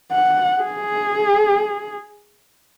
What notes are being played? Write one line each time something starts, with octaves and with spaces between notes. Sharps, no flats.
F#5
G#4